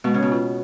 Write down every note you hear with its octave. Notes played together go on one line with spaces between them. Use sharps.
B2 G#3
C#3
B2
C#4 F4 B4